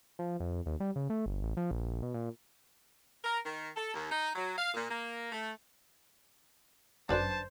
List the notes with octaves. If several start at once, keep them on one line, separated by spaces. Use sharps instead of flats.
F3
F2
D#2
G3
C#3
A3
G1
A1
F3
A#1
B2
A#2
A#4
D#3
A4
D#2
D#4
F#3
F5
A#2
A#3
A3
G1 F#2 D4 B4 C5 D5 A5